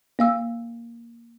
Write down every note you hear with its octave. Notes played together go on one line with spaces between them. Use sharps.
A#3 F5 E6